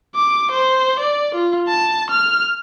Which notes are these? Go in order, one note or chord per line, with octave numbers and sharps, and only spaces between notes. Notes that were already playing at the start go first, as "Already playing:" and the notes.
D6
C5
D5
F4
A5
F6